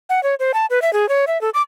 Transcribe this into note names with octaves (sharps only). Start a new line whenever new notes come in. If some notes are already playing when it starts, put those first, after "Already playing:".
F#5
C#5
C5
A5
B4
E5
G#4
C#5
E5
A4
D6